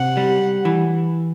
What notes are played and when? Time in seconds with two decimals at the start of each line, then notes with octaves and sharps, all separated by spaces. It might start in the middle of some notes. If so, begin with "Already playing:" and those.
Already playing: C3 F#5
0.17 G3
0.65 E3